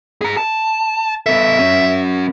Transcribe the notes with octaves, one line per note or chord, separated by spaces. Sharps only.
G#4 A#5
A5
B3 A4 E5
F#3 C#4